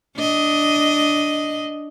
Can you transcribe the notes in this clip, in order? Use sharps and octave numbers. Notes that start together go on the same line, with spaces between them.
D4 D#5